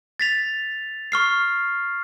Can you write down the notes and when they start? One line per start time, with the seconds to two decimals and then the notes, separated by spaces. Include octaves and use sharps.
0.20 A6 B6 F7
1.12 C#6 F6 C7